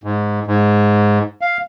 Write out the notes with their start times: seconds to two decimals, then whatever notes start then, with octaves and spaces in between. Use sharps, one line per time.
0.04 G#2
0.47 G#2
1.41 F5